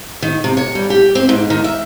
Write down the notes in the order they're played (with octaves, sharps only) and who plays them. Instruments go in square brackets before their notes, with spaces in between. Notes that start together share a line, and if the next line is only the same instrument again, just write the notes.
[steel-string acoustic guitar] D#3
C3
C#5
G3
G4
C4
G#2
D#3
E5